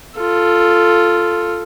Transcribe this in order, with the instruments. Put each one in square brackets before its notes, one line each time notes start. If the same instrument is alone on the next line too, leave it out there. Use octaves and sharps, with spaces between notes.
[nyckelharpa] F4 A4